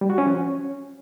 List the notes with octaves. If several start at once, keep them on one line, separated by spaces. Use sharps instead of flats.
G3
F#4
C#4
F3
C#4